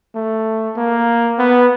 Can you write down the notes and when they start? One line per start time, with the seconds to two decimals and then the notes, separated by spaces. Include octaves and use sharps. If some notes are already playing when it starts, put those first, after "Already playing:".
0.15 A3
0.77 A#3
1.39 B3